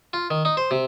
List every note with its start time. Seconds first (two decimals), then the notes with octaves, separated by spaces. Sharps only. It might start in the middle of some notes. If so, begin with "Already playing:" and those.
0.13 F4
0.30 D#3
0.45 D#4
0.57 C5
0.71 C3